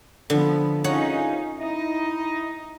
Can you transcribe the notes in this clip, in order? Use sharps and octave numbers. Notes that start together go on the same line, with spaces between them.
D3 F3 B3
C2 C#3 C#4 D#4 F4 C#5 F#5
D#4 E4 D#5